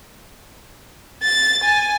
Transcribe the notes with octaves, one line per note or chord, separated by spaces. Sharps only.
A6
G#5